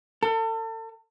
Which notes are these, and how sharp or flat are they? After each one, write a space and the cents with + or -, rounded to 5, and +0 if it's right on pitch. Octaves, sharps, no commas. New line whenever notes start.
A4 +35